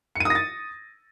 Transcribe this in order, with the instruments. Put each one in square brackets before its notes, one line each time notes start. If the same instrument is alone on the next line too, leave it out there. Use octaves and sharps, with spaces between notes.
[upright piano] C#7
D#7
D#6
A#6
A6